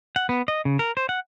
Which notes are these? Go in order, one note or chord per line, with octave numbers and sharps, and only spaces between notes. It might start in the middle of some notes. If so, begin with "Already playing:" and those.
F#5
B3
D#5
C#3
A#4
C5
F#5